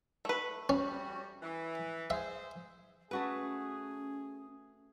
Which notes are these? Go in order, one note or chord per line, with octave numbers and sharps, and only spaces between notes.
A3 B4
G3 C#4 F#4
E3
G#4 C5 E5
A3 C#4 F#4 G#4 B4